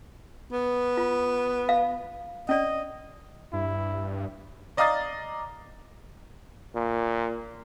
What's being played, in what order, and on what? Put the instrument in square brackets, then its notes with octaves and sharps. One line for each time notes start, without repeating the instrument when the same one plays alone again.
[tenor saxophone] B3
[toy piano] F4
F5
[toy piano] C#4 D5 [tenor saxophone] D#5
[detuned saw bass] G2 [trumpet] E4
[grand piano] D5 D#5 F5 A#5 D#6 A6
[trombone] A#2